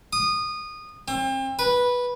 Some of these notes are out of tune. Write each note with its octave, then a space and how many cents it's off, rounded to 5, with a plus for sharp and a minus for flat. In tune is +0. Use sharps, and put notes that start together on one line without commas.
D#6 -20
C4 +35
B4 -10